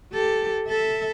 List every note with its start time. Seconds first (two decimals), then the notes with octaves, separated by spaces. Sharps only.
0.13 G4 A4
0.68 A4 E5